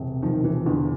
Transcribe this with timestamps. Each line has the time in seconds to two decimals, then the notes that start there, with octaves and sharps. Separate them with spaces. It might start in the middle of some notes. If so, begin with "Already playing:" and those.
Already playing: E1 C3
0.22 D#3 F3
0.44 E3
0.66 E2 D3